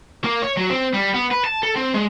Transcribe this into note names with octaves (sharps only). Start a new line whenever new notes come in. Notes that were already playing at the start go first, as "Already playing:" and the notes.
A#3
C#5
F#3
C4
G3
B3
B4
A5
A4
C4
G#3